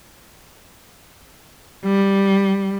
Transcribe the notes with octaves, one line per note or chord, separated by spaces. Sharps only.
G3